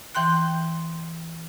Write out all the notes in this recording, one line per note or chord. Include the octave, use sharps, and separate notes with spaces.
E3 G5 C6 F#6